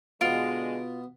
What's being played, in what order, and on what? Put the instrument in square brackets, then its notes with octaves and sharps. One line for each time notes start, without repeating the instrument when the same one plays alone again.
[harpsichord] B2 B3 [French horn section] D3 G#3 [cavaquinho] F4 [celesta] D7